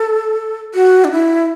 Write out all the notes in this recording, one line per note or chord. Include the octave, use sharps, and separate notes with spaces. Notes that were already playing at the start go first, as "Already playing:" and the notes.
Already playing: A4
F#4
D4
E4